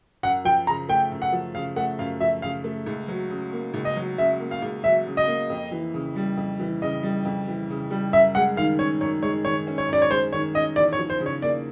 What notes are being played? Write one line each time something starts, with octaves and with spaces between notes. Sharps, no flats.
F#2 F#5
F3 G5
C#3 A#5
A3 G5
F#2
F#5
F3
C#3 F5
A3 F#5
F#2 F5
F3 E5
C#3 F5
A3
C#2
F#3
C#3
A#3
C#2
D#5
F#3
C#3 E5
A#3
F5
C#2
F#3 E5
C#3
D#5
A#3
F2
E3
C#3
G3
F2
E3
C#3 D#5
G3
F2
E3
C#3
G3
F#2 E5
G#3 F#5
D#3 F5
C#4 C#5
F#2 C#5
G#3 C#5
D#3 C#5
C#4
C#5
F#2 D5
C#5
G#3 C5
D#3 C#5
C#4 D#5
E2 D5
C#5
F3
C5
C#3
C#5
A#3 D5